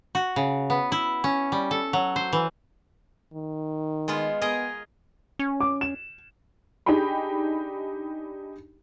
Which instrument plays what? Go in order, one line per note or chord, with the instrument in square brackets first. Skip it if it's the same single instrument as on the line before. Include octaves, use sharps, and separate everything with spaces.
[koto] F#4
C#3
B3
E4
C#4
G3
A4
F#3
C5
E3
[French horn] D#3
[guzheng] G#3 B3 F4
[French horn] B3 [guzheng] G#4 A#4 D#5
[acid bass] C#4
[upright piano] D6
E7
[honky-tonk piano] D4 D#4 G4 G#4 G5 B5